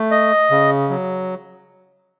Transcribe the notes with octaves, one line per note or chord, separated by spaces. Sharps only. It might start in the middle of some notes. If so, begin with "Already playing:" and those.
Already playing: A3
D#5
C#3
F#3